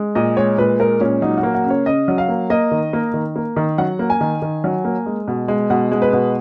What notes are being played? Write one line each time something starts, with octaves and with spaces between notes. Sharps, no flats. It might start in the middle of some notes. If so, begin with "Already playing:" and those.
Already playing: G#3
A#2 D#5
G#3 C#5
A#2 B4
G#3 A#4
A#2 C#4
F#3 D#4
F#4
A#3
F#4
C#3
C#5
C#3 D#5
F#3
F5
A#3
A#3 D#5
D#3
A#3
D#3
A#3
D#3
F#3 F#5
A#3
G#5
D#3
D#3
F#3
A#3
G#3
B2
G#3
B2 F#5
G#3
B4
B2